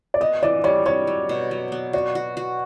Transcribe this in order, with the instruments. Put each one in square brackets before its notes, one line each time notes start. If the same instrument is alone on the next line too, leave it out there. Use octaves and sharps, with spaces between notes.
[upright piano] D5
[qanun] B3 [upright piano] D#5
[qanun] E3 [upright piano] D5
[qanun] G3 [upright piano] C#5
[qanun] G3 [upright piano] C#5
[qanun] F#3
B2
F#3
B3
[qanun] F#4 [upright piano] D5
[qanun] F#4
F#4